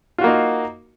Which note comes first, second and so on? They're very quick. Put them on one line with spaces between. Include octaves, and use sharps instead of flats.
F4 F#4 A#3 D#4